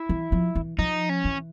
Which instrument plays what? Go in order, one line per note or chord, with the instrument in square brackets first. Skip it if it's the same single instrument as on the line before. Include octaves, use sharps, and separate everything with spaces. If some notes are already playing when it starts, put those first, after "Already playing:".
Already playing: [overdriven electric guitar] E4
[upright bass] E3
F3
E3
[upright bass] F3 [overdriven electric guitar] D#4
[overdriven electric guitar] C#4
[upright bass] E3